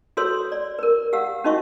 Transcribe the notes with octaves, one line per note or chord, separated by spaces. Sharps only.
F#4 A4 B4 C#5 C6 E6
D5
A#4 B4
G4 F5 F#5 E6
C#4 D#4 F#4 D#5 E5 C#6